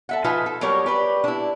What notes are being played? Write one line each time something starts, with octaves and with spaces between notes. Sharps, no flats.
A4 E5 F#5
F3 D#4 F4 B4 E5 G#5
A4
F#3 G3 G4 A#4 C#5
G4 B4 D5
D4 E4